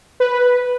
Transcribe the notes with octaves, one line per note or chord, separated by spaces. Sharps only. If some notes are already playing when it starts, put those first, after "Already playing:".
B4